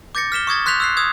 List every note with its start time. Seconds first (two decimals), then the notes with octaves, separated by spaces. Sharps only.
0.15 D6 G6 A6 A#6 C#7
0.32 F6 B6 E7 G7
0.47 C#6 D#6 G#6 A6
0.66 C6 F#6 G6 B6 F7
0.80 E6 F#6 C7
0.97 D#6 E6 G#6